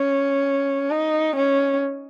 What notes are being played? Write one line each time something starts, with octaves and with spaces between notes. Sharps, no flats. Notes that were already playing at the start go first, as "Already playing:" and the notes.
Already playing: C#4
D#4
C#4